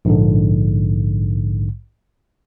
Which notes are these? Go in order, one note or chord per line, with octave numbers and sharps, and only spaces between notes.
A#1 G#2 D3